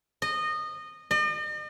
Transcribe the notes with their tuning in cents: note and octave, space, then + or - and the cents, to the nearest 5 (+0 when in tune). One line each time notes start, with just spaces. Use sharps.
D#5 -20
D#5 -45